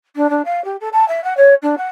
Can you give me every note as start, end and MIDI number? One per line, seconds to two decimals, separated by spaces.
0.16 0.29 62
0.30 0.42 62
0.45 0.63 77
0.64 0.76 67
0.80 0.88 69
0.92 1.07 81
1.08 1.23 76
1.24 1.36 78
1.37 1.54 73
1.62 1.75 62
1.77 1.89 78